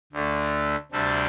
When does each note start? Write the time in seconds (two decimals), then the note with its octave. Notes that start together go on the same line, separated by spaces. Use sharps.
0.13 D2 D3 A3
0.92 D2 C3 G3 D4 A4